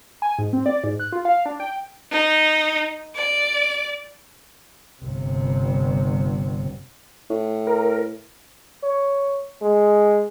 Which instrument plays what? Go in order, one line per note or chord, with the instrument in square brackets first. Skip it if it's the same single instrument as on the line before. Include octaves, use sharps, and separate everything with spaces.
[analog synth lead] G#5
G#2
C4
D5
G#2
F#6
F4
F5
D4
G5
[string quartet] D#4
D5
[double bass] G1 C3
[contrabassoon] A2
[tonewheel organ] A#4
[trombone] C#5
G#3